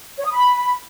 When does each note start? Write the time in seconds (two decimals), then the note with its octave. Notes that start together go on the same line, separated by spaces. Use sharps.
0.18 C#5
0.25 D#6
0.32 B5